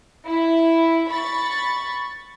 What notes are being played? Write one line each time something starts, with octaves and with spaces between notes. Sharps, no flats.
E4
B5 C#6 A6